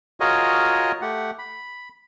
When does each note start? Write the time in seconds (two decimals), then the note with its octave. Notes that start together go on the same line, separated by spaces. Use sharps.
0.20 F4 F#4 G#4 A#4 C#5 D#5
1.02 A3 G4 F#5
1.39 B5